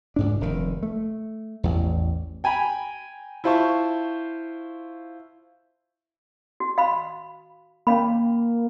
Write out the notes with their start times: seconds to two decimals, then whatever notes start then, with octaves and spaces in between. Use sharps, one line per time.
0.16 C#2 G#2 D4
0.41 F1 D#3
0.83 A3
1.64 A1 E2
2.44 G5 G#5 A#5 B5
3.44 E4 F4 C5 E5 A5 C#6
6.60 F#4
6.78 F5 B5
7.87 A#3 C#4 F5 B5